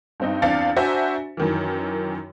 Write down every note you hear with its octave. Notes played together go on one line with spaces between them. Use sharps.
G2 C4 D#4
E2 C4 D4 F5 A6 C#7
D4 F#4 C5 E5 G#5 A#5
F#2 D#3 E3